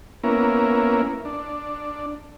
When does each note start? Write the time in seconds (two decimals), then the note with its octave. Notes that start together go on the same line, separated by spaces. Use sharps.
0.24 A#3 B3 C#4 E4 A#4
1.25 D4